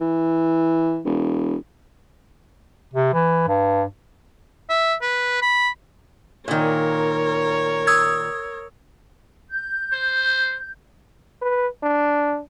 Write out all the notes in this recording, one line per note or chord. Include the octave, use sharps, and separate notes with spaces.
E3
E1
C3
E3
G2
E5
B4
B5
A#2 D#3 A#4 C#5
D#6 E6 G#6
G6
C5
B4
D4